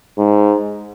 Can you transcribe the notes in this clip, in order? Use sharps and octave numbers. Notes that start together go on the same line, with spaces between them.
G#2